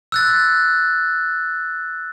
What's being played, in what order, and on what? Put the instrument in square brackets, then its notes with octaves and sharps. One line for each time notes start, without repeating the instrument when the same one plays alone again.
[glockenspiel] E6 F#6 A6